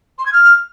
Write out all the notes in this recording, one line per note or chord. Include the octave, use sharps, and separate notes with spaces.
C6
G#6
F6